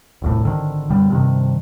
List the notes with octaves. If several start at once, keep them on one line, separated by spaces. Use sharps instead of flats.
D#1 C2 A2
G#1 D3 D#3
F#2 B2 D3 G3
G2 C3 D#3